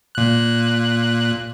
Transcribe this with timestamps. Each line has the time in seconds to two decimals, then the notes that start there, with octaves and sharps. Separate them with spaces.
0.15 A#2 F#6